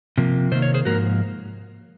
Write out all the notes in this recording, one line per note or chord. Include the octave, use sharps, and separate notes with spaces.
C3 F3 A#3
C3 D#3 A#3 C5
C#5
G#4 C5
G#2 F3 A#3 F#4 A#4